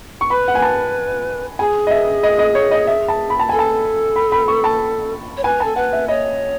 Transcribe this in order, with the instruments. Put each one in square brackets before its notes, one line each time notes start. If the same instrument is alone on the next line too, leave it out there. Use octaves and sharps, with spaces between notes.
[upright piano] C#6
[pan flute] B4 [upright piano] B5
[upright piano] F#5
G#5
A5
[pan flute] G#4 [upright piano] G#5
[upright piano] D#5
E5
D#5
D#5
C#5
D#5
E5
A5
B5
A5
[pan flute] A4 [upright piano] G#5
[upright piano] A5
B5
B5
C#6
A5
[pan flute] C#5
[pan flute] B4 [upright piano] G#5
[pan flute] A4 [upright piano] A5
[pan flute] B4 [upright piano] F#5
[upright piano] E5
[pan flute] C#5 [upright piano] D#5